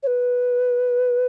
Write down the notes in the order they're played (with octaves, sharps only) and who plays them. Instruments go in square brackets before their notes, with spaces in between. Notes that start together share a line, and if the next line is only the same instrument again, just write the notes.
[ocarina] C#5
B4